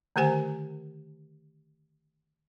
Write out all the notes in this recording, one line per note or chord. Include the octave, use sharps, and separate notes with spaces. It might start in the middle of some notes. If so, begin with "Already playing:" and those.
D3 D#3 A3 G4 C5 G#5